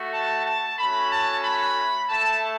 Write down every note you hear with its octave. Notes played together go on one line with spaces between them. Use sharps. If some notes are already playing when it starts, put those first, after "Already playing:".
Already playing: A3 F#4
A5
A5
A3 C#4 F#4 B5
A5
B5
A3 E4 A5